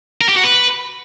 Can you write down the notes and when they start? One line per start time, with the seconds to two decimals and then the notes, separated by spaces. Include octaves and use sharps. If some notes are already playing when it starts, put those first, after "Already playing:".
0.21 A#4
0.29 G4
0.36 F#4
0.43 B4